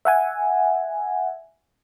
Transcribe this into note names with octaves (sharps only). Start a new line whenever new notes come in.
E5 F#5 G#5